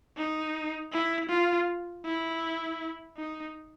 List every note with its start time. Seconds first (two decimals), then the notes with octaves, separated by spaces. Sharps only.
0.17 D#4
0.92 E4
1.29 F4
2.05 E4
3.17 D#4